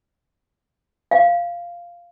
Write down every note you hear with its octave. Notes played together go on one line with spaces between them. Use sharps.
F5